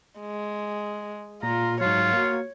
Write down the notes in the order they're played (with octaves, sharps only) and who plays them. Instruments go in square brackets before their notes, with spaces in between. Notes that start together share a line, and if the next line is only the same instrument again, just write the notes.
[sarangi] G#3
[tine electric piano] A#2 [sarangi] F4 [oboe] A#5
[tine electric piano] G#2 F#3 [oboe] F4 [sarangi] C#5
[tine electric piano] A#3 F#4